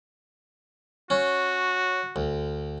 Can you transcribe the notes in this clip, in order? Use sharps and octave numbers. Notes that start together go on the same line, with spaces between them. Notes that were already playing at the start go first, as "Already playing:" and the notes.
C#4 F#4
D2